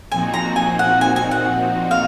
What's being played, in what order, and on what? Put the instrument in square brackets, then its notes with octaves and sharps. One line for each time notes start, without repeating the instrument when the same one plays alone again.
[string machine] A#2 F3 C4 D#4 F#4 [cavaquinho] G#5
[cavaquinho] A#5
G#5
F#5
G#5
G#5
F#5
F5